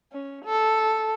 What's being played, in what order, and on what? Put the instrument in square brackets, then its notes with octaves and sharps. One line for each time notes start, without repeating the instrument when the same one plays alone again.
[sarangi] C#4
A4